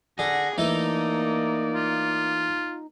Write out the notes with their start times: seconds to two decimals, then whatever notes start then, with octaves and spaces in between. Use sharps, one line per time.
0.19 D3 G#4 F#5 A#6
0.58 E3 A3 A#3 D#4 D5
1.74 F4